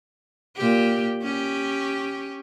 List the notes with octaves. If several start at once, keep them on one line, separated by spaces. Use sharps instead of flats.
A#2 G4
C#4 G4